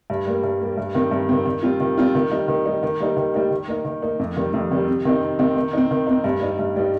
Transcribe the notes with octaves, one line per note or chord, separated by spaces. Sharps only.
G2
G3 A#3
G2
G3 A#3
G2
D#3 C4
G2
D#3 C4
D#3
G3 C4 F4
D#3
G3 C4 F4
D#3
G3 D#4
D#3
G3 D#4
D#3
G3 A#3 D#4
D#3
G3 A#3 D#4
D#3
A#3 D#4
D#3
A#3 D#4
F2
C3 D#3 G3
F2
C3 D#3 G3
C3
D#3 C4 D#4
C3
D#3 C4 D#4
D#3
C4 D#4
D#3
C4 D#4
G2
G3 D#4
G2
G3 D#4